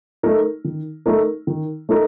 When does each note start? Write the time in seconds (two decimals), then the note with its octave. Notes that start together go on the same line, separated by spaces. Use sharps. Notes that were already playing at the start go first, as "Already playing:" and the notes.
0.23 A3 D#4 A#4
0.64 D#3
1.06 A3 D#4 A#4
1.47 D#3
1.89 A3 D#4 A#4